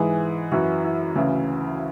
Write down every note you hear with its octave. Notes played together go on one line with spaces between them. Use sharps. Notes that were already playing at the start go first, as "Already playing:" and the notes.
Already playing: G#2 E3 G#4
F#2 E3 F#4
E4
D2 C#3 E3 E4